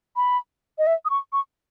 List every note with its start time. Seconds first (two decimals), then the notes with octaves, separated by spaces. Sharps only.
0.16 B5
0.78 D#5
0.87 E5
1.05 D#6
1.10 C#6
1.33 C#6